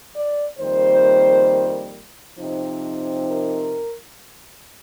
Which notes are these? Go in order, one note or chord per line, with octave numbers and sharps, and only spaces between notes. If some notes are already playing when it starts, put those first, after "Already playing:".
D5
F2 D#3 G3 A#3 C5
C3 F3 C4 D#4
A#4